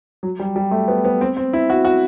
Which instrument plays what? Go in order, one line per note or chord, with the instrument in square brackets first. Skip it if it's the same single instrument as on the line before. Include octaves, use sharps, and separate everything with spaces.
[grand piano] F#3
G3
G3
A3
B3
B3
C4
C4
E4
F#4
F#4